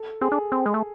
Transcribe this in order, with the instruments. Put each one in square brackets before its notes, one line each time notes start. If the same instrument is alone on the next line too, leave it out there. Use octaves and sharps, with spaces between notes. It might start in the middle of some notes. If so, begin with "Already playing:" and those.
Already playing: [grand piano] A4
[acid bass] C4 [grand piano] G#4
[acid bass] D4
C4
G#3
A3